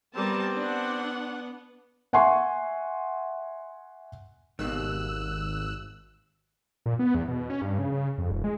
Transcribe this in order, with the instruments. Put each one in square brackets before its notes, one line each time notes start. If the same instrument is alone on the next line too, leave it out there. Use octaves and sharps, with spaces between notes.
[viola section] G3 A#4 A5 [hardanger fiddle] B3 [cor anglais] C4
[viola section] D4 F#5
[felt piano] E5 F#5 G#5 C6 C#6
[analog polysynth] G#1 E6 F#6 [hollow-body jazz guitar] D#2 B2 D#3
[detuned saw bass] A#2
B3
E2
B2
C#4
G2
C#3
C#3
F2
D#1
G#3